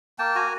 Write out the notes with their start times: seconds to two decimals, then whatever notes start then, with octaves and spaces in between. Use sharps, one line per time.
0.19 A#3 G5 A5
0.35 F#4 G#5 A#5